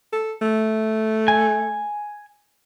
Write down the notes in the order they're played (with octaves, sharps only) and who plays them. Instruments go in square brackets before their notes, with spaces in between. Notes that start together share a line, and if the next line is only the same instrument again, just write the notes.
[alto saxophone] A4
A3
[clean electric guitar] G#5